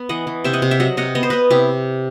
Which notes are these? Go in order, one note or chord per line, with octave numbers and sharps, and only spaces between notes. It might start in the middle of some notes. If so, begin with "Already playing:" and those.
Already playing: B3
E3 D#5 F#5
E3
C3 E5 G5
D#5 F#5
C3
E5 G5
F#3 D#5 F#5
C3 D#5 F#5
B3 D#5
C5
B3 B4 D#5
C3 E4 G4